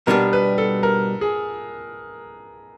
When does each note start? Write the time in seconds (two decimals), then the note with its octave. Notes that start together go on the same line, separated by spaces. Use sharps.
0.07 B2 G3 B3 D4 G4 A#4
0.33 B4
0.58 A4
0.83 A#4
1.21 G#4